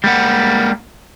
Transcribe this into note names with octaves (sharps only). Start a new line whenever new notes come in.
G3 G#3 A#3 F#5